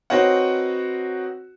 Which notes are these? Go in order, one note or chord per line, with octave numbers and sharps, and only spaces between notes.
C4 D#4 F#4 B4 C#5 F#5